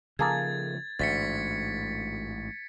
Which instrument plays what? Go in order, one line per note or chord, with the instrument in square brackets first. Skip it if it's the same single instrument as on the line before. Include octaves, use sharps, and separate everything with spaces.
[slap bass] C#3 F3 [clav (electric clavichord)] A#3 G#4 A4 [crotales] G#6 A6
[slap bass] A1 G#2 [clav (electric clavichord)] D2 [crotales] A6 B6 C#7